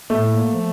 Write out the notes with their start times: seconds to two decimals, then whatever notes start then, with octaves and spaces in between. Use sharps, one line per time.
0.10 A2 A3
0.29 A#3
0.48 F3